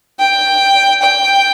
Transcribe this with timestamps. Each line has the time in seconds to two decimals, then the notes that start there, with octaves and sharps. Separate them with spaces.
0.19 G5
1.02 G5